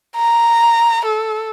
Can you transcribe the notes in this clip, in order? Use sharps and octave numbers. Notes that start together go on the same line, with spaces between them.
A#5
A4